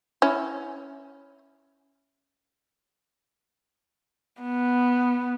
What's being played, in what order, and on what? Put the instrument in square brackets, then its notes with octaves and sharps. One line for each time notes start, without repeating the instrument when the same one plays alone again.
[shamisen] C#4 E4
[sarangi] B3